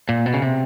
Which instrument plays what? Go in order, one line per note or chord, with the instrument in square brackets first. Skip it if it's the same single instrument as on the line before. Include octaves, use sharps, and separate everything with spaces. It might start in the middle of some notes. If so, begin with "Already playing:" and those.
[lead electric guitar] A#2
B2
C#3
C3